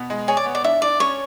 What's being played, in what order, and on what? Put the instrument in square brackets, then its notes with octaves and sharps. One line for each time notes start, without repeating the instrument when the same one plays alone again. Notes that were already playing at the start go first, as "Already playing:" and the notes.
Already playing: [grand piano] B2 B3
G#3
[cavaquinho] G#4 [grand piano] C#5
[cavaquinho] D5
[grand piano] B3
[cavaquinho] D5
[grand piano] D4 [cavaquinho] E5
[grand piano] D4 [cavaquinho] D5
[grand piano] C#4 [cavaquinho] C#5